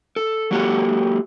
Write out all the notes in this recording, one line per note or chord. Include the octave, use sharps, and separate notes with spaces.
A4
F#3 A#3 F#4 G4 A4